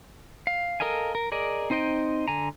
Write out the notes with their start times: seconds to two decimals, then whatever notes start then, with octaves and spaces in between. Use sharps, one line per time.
0.47 F5
0.80 A4 A#4 D#5 F5 G#5
1.15 A#4
1.32 G#4 A#4 D5 D#5
1.70 C4 D#4 C5 D#5 G5
2.28 D3 G#5 A#5